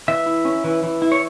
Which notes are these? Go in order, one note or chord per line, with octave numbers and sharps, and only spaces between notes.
E3 E5
E4
C#4
E3
E3
E4
C#5